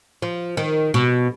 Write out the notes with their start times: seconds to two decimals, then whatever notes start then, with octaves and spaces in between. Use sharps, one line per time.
0.22 F3
0.57 D#3
0.94 B2